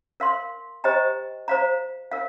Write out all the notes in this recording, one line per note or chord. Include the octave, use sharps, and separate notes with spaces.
A#4 F5 C6
G4 C5 D#5 G5 A#5
C5 F5 A#5
A#4 F5